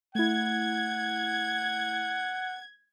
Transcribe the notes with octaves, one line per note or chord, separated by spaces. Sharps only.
A3 E4 F#5 G#6